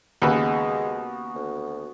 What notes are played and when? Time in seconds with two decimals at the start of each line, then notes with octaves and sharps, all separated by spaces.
0.22 D#2 C#3 G#3 B3 F#4 B4
1.35 D2